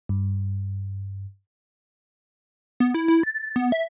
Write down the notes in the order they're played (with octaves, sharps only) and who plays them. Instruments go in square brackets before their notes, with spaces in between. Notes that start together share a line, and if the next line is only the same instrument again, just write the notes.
[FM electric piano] G2
[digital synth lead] B3
E4
E4
A6
B3
E5